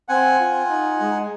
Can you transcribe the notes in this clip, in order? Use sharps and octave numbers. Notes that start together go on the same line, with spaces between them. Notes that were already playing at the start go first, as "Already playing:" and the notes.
C4 F#5 G#5
F4
D#4
G#3